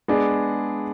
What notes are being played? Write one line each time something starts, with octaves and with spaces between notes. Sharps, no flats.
G#3 B3 D4 G#4